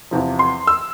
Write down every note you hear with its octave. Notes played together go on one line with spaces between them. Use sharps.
E2 C3 F3
C6
E6